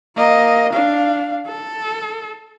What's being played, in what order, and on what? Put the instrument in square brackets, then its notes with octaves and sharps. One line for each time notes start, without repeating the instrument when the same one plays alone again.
[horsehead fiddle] A#3 D#5
D4 F5
A4